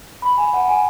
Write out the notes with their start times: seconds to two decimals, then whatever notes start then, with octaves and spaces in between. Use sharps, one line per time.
0.22 B5
0.38 G#5
0.54 F#5
0.68 G#5